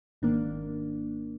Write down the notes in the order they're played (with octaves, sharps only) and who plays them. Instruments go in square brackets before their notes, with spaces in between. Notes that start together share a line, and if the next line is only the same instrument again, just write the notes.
[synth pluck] G#1 G#2 D#3 A#3 D4